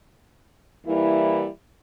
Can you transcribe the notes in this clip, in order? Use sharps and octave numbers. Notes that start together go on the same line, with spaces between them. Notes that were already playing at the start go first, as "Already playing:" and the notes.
E3 G3 A#3 E4